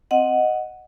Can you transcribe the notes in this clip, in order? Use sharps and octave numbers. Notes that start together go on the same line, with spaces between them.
C4 D#5 F#5